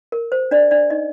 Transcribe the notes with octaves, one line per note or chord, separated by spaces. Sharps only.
A#4
C5
D4 D5
D4 D5
D#4 D#5